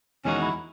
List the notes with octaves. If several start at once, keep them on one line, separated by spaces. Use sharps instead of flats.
E2 D#3 G#3 C#4 D#4 F#4
E4